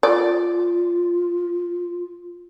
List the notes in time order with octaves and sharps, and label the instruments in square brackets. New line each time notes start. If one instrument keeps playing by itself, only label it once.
[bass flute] F4 [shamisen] D5